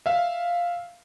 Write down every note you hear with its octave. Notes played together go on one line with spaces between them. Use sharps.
E5 F5